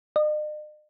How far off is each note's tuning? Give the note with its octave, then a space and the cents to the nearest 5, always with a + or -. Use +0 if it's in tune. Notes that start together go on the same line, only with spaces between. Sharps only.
D#5 -45